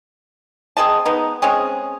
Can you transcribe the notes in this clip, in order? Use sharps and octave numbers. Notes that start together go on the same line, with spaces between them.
C4 G#4 D#5 A5
G#3 B3 D#4
G#3 C4 C#4 G#4